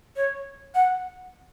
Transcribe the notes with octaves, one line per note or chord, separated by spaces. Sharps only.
C#5
F#5